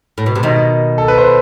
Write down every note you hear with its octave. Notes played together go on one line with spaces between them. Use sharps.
A2
B2
C3
B2 D#3 D#4 D#5
A4
B4
C5